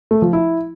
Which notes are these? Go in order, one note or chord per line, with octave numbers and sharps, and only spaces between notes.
A3
F3
E4